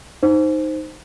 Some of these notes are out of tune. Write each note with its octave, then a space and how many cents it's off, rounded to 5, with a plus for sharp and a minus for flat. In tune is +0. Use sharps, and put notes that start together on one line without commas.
D#4 +0 C5 +0